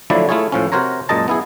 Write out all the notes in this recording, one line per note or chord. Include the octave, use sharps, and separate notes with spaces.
D3 F3 F#3 A3 E4 D5
A3 E4 F4 G#4 C#5
A2 F3 C#4
C3 F#4 A#4 C5 C#5 A#5
F#2 A#2 G#3 D#5 A5 A#5
B3 E4 G#4